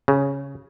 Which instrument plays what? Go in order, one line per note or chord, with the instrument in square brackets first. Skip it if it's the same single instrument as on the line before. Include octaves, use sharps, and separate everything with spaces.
[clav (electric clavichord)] C#3